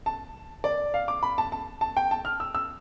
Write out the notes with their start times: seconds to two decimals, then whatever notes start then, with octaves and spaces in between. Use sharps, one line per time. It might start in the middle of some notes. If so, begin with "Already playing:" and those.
0.06 A5
0.64 D5
0.94 F5
1.08 D6
1.23 B5
1.38 A5
1.52 A5
1.81 A5
1.97 G5
2.11 A5
2.25 F6
2.40 E6
2.55 E6